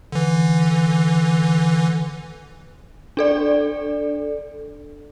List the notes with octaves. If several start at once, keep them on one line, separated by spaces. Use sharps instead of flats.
D3 E3
D4 A4 D5